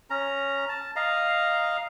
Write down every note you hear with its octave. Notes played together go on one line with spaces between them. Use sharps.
C#4 A#5
A5
D#5 F5 A#5